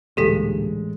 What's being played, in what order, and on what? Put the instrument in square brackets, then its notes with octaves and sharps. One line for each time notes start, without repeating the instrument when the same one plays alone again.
[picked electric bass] A1 [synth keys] D2 G2 A#2 [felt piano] G#3 [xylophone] G4 A4 B6